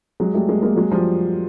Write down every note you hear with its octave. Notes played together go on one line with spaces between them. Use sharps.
F#3 G#3
G3 A3
G#3 A#3
G#3 A#3
F#3 G#3
F3 G3